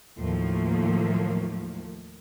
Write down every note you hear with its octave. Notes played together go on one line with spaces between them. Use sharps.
D#2 A2 F3 F#3 A3 A#3